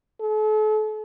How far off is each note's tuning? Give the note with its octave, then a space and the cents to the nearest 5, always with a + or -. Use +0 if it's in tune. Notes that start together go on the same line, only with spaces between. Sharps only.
A4 -40